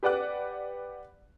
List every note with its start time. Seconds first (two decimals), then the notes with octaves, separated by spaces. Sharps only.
0.03 G4 B4 D5 F#5 D6 F#6